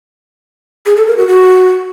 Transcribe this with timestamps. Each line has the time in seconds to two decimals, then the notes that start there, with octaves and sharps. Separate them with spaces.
0.86 G#4
0.96 A4
1.07 A#4
1.17 F#4
1.28 F#4